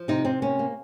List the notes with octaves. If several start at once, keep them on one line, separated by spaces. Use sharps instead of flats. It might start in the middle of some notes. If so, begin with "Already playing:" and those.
Already playing: F3
C3 D#4
C3 C4
A#3 C#4
A#3